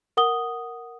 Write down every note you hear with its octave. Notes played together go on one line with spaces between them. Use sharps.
A#4 F#5 D#6 G7